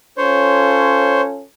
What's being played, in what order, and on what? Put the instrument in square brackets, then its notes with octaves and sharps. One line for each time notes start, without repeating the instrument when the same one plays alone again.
[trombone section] C#4 F4 A4 [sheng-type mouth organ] C5 C#5